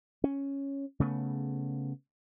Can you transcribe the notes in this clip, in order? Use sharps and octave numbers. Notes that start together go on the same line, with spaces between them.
C#4
C#3 A3 B3